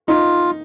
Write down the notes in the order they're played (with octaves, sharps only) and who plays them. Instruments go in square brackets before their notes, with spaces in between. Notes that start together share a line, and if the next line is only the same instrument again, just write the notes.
[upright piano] D#4 [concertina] F4